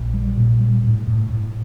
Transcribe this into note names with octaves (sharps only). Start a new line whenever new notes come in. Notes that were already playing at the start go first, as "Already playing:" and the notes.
Already playing: A#1
G3
A#2
G3
A2
A2
A2